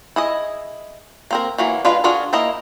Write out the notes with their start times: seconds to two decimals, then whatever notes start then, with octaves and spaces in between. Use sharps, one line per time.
0.16 E4 G#4 D#5
1.31 A#3 C4 A#4
1.58 E3 F#3 A#3
1.85 G#3 D4 F4 B4 F5
2.04 D4 F4 F#4 G#4 A#4
2.33 A#3 E4 A#4 D#5